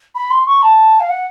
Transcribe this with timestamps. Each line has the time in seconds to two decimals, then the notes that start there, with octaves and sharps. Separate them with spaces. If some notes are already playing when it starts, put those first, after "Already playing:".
0.15 B5
0.31 C6
0.46 C#6
0.62 A5
1.00 F5
1.09 F#5